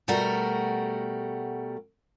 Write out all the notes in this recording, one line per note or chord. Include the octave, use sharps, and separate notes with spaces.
B2 G3 A3 F#4 A#4